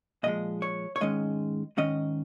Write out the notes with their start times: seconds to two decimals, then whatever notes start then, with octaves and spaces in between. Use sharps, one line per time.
0.23 A#2 F3 G#3 D#5
0.62 C#5
0.96 C#5
1.01 G#2 D#3 G#3 C#4 D#5
1.77 G#2 D#3 C#4 D#5